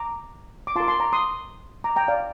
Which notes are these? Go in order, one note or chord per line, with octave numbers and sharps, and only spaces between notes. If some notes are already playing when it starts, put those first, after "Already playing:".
Already playing: A#5 D6
D6
F4 A#4 A5 C6 D6
A5 C6
A#5 D6
C6 D#6
A#5 D6
G5 A#5
D5 F5